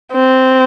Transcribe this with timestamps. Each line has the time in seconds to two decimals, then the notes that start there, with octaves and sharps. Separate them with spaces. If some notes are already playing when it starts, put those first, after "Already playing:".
0.13 C4